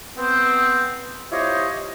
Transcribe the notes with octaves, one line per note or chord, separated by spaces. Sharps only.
B3 C4
E4 F4 G4 C5 C#5 D#5